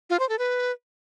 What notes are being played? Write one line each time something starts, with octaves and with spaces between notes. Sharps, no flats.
F4
C5
A4
B4